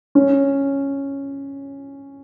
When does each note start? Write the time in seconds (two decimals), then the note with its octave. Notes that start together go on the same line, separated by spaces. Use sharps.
0.15 C#4